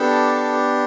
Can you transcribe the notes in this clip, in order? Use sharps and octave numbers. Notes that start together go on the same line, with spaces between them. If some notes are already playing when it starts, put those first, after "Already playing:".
Already playing: B3 D4 G4 A4